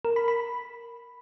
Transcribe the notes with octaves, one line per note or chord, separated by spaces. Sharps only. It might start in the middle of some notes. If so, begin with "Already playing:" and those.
A#4
B5
B5